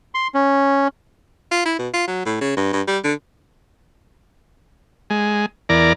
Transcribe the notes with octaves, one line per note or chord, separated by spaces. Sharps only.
C6
C#4
F4
E4
B2
F4
F#3
A2
C#3
G2
G2
G3
D3
G#3
E2 A#4 D5